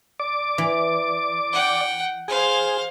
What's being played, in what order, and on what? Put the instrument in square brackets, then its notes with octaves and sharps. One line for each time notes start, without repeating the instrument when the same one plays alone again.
[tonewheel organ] D5 D6
[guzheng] E3
[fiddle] F#5 G5
[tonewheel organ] G#4 [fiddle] C5 F5